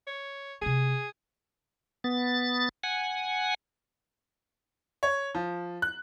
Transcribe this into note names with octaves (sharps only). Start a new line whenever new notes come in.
C#5
C3 A3 G#4
B3 A6
F#5 G#5
C#5
F3
F#6